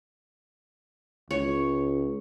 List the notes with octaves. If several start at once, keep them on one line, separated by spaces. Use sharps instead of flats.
C#2 C#5